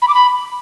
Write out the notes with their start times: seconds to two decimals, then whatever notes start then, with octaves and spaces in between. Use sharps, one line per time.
0.02 B5
0.08 D6
0.14 B5